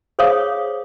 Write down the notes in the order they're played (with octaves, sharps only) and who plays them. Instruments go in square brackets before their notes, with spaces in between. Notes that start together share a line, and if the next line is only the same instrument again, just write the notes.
[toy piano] G#4 C5 C#5 F5 D#6